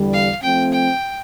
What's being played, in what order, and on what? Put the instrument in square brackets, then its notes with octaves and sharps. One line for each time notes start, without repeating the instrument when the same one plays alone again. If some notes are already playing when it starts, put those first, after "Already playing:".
Already playing: [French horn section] E2 D3 G3
[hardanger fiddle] F5
[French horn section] F3 A3 C4 [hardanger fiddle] G5
[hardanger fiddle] G5